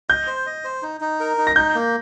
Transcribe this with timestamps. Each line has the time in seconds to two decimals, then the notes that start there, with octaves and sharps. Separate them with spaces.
0.09 D#5 G6
0.27 C5
0.46 D#5
0.64 C5
0.82 D#4
1.01 D#4
1.20 A#4
1.38 D#4
1.47 A#6
1.56 D#4 G6
1.75 A#3